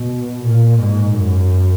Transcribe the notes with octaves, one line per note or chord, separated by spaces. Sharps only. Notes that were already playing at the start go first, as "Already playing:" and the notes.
Already playing: B2
A#2
G#2
F#2